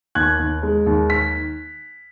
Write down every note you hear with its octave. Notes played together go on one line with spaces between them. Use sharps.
D#2 F#6 G#6
D#2
G#3
D#2
B6